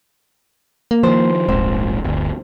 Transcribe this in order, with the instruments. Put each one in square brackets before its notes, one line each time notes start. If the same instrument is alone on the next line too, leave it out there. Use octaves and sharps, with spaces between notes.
[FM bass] A#3
[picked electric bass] D#3 F3 [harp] C5
[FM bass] D1 [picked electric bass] A#1 G#2 [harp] C4
[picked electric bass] G1 D2